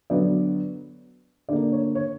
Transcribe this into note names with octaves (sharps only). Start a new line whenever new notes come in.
D3 F#3 B3 D5
D3 A#3 D5
C#5
C#5